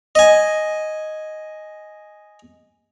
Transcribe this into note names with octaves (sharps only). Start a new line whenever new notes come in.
D#5 G#5